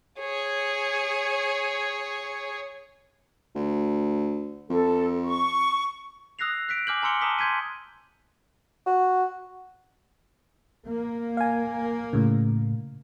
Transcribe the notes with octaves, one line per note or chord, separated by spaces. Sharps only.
G#4 C#5
D2
F2 A4
C#6
D#6 E6 F#6 A#6 C7 F7
F#6 B6 D7
G#5 D6 F6 G6 F#7
G#5 A#5 C6 E6 C#7 G7
A5 A#5 D6 D#6 B6 G7
C6 G6 G#6 B6 D#7
F#4
A#3
F5 G#5
A2 C#3